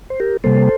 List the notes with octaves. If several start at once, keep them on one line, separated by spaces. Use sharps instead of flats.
C5
G4 A#4
C3 G3 A#3 A4 C5